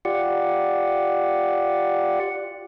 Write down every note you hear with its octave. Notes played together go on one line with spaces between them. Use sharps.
F4 G4 D5 F#5